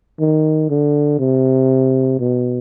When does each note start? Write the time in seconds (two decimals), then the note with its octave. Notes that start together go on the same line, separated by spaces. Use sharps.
0.20 D#3
0.70 D3
1.19 C3
2.20 B2